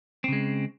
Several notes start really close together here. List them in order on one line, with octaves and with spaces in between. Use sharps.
C4 C#3 G#3